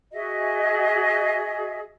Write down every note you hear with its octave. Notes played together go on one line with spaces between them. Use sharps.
F#4 G#4 D#5 E5